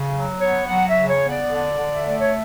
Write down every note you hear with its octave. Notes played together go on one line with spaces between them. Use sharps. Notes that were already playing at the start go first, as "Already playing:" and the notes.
Already playing: C#3
F#3
B3 C#5
F#3 F#5
E5
C#3
C#5
B3
D5
D3
D3
E5
A3 D5
C#5